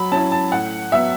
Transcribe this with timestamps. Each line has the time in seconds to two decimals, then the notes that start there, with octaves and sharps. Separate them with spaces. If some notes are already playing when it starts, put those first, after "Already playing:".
Already playing: F#3 B5
0.12 C#4 E4 A5
0.32 A5
0.52 A2 F#5
0.92 F#3 B3 E5